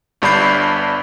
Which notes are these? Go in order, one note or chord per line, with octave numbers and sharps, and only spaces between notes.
G1 G2 D4 B5 G6 C7